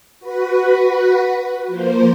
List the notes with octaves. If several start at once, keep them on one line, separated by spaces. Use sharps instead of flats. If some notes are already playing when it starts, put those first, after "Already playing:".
F#4 B4
F3 A#3 C5